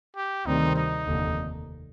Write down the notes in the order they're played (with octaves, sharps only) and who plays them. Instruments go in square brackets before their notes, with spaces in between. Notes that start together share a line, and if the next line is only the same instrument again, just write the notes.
[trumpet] G4
[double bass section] D2 C3 D#3 G3 C4 [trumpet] D#4
[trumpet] D#4
[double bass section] F1 D#2 D3